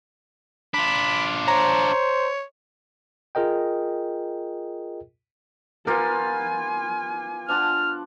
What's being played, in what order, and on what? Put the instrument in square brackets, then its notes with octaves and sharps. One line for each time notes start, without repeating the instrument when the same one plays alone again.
[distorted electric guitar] D4 F4 [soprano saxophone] B5
[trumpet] C5 [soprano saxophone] C#5 [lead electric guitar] A#5
[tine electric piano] F4 G#4 A#4 D#5 G5
[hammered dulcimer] B3 F4 G4 [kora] A#4 [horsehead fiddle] G#5
[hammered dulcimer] F3 D4 F#5 [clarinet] F6